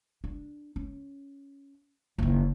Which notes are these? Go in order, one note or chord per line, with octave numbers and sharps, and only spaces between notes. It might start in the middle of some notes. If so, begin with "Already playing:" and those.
D4
C#4
F#1 D#3